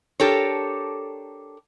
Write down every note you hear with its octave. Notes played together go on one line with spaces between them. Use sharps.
D4 G4 A4 A#4 C#5